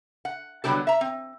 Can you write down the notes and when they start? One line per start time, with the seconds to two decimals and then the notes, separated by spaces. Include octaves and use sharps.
0.25 F#5
0.64 D3 F#3 G3 B3 G4 A4
0.87 E5 A#5
1.01 C4